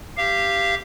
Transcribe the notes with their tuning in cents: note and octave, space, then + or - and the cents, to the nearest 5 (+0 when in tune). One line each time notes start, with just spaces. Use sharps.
G4 +5 F5 -25